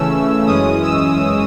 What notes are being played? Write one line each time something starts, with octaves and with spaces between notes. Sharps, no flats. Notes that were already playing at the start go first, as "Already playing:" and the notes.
Already playing: C#3 E3 A3 C#4 E6
F#2 E3 G#3 C#4 D#6
E6